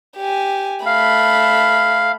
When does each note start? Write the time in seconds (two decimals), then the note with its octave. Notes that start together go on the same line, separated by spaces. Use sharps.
0.18 G4 G#5
0.86 A3 F5 B5